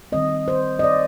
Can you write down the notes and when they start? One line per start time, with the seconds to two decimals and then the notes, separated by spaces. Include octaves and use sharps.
0.12 D#3 G3 C4 D#5
0.48 C5
0.79 D#5
0.83 D5